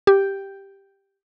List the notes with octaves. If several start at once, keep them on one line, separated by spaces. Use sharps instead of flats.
G4